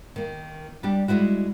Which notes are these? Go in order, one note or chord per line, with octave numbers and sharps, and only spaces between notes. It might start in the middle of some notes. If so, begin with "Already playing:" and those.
D#3 A#3
G3 D4 G4
G3 G#3 A#3 E4 F#4